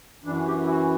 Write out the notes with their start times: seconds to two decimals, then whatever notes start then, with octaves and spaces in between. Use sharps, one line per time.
0.24 F#2 E3 D4
0.46 G4
0.65 E4
0.68 F#4